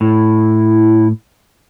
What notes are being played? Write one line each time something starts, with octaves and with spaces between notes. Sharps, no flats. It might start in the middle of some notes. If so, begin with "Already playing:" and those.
A2 E4